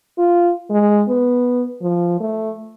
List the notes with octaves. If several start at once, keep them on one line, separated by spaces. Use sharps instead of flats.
F4
G#3
B3
F3
A3